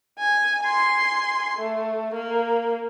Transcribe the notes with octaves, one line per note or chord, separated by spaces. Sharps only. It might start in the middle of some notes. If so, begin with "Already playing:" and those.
G#5
G#5 C6
A3
A#3